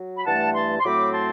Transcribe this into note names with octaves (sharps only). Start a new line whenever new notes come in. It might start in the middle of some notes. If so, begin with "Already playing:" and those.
Already playing: F#3
B5
G2 E3 A3 F#5 A5
A5 C6
C6
A2 F#3 A3 C4 B5 D6
A5 C6